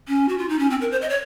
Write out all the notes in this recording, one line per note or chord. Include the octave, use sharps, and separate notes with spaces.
C#4
F#4
F4
D#4
C#4
C4
A#4
C5
D#5
C#5